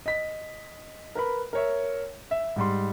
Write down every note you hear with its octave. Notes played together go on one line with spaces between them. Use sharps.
D#5 B6
A#4 B4 B5
A#4 C#5 E5
E5
G#2 G3 C6